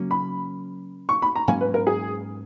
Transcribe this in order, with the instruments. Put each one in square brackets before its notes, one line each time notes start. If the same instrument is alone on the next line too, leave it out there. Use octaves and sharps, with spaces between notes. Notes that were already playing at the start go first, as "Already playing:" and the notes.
Already playing: [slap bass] C#3 F#3 A#3 C#4
[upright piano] B5
C#6
B5
A#5
[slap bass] G#2 F#3 A#3 C#4 [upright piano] G#5
[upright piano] B4
A#4
G#4